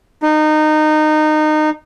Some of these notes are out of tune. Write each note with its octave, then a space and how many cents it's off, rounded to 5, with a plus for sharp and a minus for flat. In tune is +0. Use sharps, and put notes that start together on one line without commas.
D#4 -20